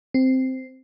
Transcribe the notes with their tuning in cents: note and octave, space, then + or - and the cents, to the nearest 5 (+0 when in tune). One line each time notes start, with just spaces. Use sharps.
C4 -5